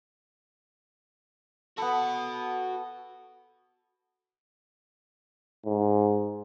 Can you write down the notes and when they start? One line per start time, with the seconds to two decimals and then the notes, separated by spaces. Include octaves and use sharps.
1.78 B3 F#4 A4 B5
5.66 G#2